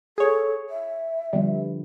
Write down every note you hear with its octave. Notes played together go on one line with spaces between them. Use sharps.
G#4 A4 C#5
E5
D3 F3 G3 B3